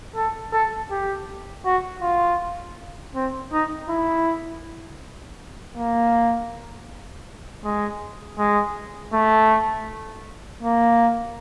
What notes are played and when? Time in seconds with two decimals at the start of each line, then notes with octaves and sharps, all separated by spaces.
0.16 A4
0.53 A4
0.91 G4
1.65 F#4
2.02 F4
3.15 C4
3.53 D#4
3.89 E4
5.77 A#3
7.64 G#3
8.39 G#3
9.13 A3
10.63 A#3